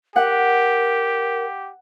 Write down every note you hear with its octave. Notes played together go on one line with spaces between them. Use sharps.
G4 A#4 F#5